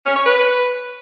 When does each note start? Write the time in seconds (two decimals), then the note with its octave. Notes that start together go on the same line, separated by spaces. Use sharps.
0.06 C#4
0.16 C#5
0.26 B4